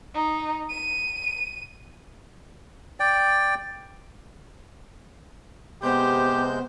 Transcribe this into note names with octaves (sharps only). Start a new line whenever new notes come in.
D#4
D#7
D5 G5
C3 G#3 B3 G4 C5 G6